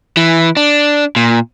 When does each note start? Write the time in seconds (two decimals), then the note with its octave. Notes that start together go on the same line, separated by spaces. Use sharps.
0.17 E3
0.57 D4
1.16 A#2